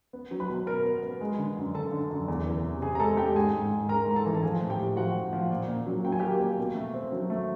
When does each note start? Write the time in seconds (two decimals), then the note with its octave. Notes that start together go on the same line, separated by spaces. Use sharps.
0.13 B3
0.31 F#3
0.40 B4 B5
0.49 B2
0.67 B3 A#4 A#5
0.85 B3
1.02 B3
1.21 G#3
1.38 D3
1.57 F#2
1.74 D3 A4 A5
1.92 D3
2.11 F#2
2.28 E2
2.45 E3
2.64 C3
2.82 C3 G#4 G#5
2.95 A#5
2.99 G#3 A4 A5
3.17 G#3 G4 G5
3.35 G#2 G#4 G#5
3.53 G#2
3.71 G#2
3.89 G#3 A#4 A#5
4.07 G#2 A#5
4.16 A4 A5
4.26 E3
4.35 A5
4.42 F3 G#4 G#5
4.60 A2
4.70 G4 G5
4.79 A2
4.96 F3 F#4 F#5
5.15 A2
5.33 F3
5.50 A#2
5.68 A#2
5.87 F#3
6.05 F#3 G5
6.12 G#5
6.19 A#3 G4 G5
6.40 A#3
6.57 B2
6.75 A3
6.94 C4
7.12 F#3
7.30 A3